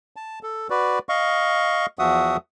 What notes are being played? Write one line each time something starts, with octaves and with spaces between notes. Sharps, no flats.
A5
A4
F#4 B4 D5
D#5 F5 C#6
E2 F3 F#4 E5 F#5 D#6